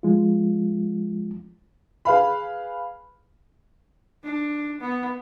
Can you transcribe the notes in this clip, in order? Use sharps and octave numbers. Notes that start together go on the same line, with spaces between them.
F3 G#3 F4
G#4 B4 F5 B5
D4
B3